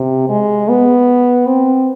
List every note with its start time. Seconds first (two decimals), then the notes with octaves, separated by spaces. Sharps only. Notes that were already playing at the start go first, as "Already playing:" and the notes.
Already playing: C3
0.29 G#3
0.69 B3
1.47 C4